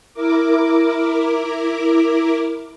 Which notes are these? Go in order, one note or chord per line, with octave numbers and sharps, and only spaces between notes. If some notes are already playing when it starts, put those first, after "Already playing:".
E4 A#4 D6